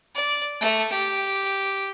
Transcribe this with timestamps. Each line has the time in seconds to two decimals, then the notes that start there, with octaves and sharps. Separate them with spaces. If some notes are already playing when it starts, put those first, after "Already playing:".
0.15 D5
0.61 A3
0.92 G4